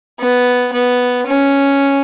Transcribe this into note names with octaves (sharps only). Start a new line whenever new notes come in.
B3
B3
C#4